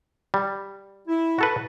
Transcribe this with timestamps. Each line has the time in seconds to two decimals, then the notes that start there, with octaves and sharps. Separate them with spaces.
0.34 G3
1.08 E4
1.38 F#4 A4 B4